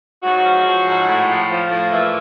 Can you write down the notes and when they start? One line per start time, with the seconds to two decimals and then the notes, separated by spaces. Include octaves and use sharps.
0.23 G#2 F#3 F#4
0.44 F3
0.66 F3
0.87 G#2
1.08 A2
1.28 F3
1.50 F3
1.70 A2
1.91 A#2 E3 E4